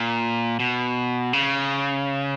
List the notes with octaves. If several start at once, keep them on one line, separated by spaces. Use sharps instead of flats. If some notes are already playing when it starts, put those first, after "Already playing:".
Already playing: A#2
B2
C#3